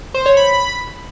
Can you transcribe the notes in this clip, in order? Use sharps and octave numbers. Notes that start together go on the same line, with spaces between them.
C5
C#5
B5